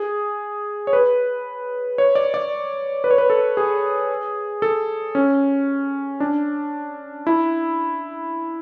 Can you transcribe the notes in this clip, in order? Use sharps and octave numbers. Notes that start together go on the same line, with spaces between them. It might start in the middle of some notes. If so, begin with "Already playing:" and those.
Already playing: G#4
C#5
B4
C#5
D5
D5
B4
C#5
B4
A4
G#4
A4
C#4
D4
E4